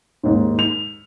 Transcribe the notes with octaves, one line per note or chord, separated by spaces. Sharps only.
D#2 G#2
F7